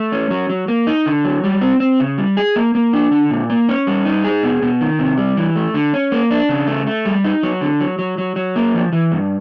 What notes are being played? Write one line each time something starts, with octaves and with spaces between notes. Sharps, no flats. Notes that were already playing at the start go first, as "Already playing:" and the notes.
Already playing: A3
C#4
F#3
F#3
A#3
D#4
D3
F#3
G3
C4
C4
C#3
G3
G#4
A#3
A#3
D4
D3
A#2
A#3
C#4
G3
D#4
G#4
B2
B2
D#3
C3
G3
E3
A3
D3
C#4
A#3
D4
C#3
A3
A3
G3
D#4
F#3
D3
F#3
F#3
F#3
F#3
A#3
F3
E3
G2